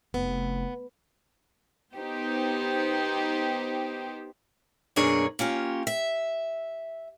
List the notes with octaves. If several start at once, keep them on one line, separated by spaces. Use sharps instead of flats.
F1 B3
B3 D#4 G4 C5
F#2 B2 A#3 D4 G#4 C#5
A#3 C#4 F4 G4
E5